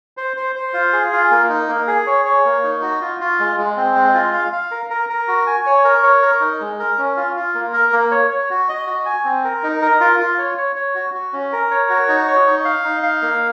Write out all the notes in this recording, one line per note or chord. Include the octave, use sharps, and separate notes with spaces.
C5
C5
C5
F4
G#4
F4
A#3
D#4
A#3
G#4
C#5
C#5
A#3
D#4
F#4
F4
F4
G#3
G#3
C4
G#3
F4
F5
F5
A#4
A#4
A#4
F#4
G#5
C#5
A#4
C#5
A#4
D#4
G#3
A#4
C#4
F4
F4
A#3
A#4
A#3
C#5
C#5
F#4
D#5
F#4
G#5
C4
A#4
D#4
A#4
F4
F4
C#5
C#5
C#5
F#4
F#4
C#4
A#4
C#5
F#4
D#4
C#5
D#4
F5
D#4
F5
A#3